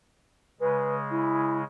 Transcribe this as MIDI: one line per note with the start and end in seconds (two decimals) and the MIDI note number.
0.61 1.64 49
0.61 1.64 56
0.61 0.95 71
1.11 1.60 64